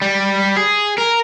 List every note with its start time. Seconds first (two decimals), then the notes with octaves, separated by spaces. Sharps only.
0.02 G3
0.56 G#4
0.98 A#4